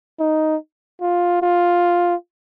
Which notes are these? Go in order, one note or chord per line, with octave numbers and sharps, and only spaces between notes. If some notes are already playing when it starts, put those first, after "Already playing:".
D#4
F4
F4